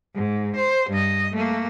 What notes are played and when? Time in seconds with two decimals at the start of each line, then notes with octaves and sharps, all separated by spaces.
0.16 G#2
0.56 C5
0.90 G2 D#5
1.34 A3 A#3